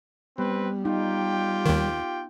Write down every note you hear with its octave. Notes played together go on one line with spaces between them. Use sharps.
G3 B3 C4 B4
D#4 F4 G4 G5
D#2 D#3